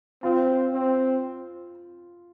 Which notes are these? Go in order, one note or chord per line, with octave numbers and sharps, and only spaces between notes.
C4 F4
C4